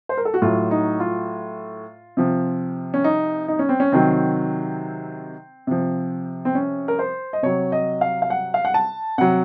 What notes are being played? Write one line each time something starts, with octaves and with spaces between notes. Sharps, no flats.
C5
A#4
A4
F#4
A2 F#3 F4
D#4
F4
C3 F3
C#4
D#4
D#4
C#4
C4
C#4
C3 D#3 F#3 C4
C3 F3
C4
C#4
A#4
C5
D#5
C3 F#3 C#5
D#5
F5
F5
F#5
F5
F#5
A5
C3 F#3 F#5